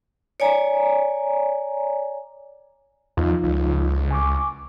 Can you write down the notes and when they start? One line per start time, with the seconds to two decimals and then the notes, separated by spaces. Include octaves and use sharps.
0.40 C#5 D5 G#5 A#5
3.17 E2 F3 D#4 F4
3.44 C#2
4.11 G#5 C#6 D6